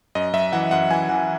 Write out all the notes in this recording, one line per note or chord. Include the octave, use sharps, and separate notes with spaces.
F#2 D#5
F#2 E5
E3 F#5
F#2 F#5
E3 G#5
E3 F#5